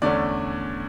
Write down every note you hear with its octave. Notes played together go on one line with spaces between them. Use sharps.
E2 D3 A3 C#4 D5